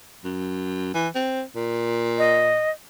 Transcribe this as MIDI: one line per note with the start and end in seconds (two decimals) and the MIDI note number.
0.24 0.93 42
0.94 1.08 52
1.15 1.43 60
1.56 2.66 46
2.18 2.71 75